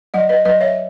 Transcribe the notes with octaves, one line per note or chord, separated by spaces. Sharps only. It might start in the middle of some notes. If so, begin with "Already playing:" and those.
F#3 D#5 F#5
B4 D#5
F#3 B4 D#5
C#5 E5